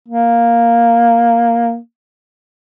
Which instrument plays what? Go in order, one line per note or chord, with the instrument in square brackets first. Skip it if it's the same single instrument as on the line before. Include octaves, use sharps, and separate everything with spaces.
[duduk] A#3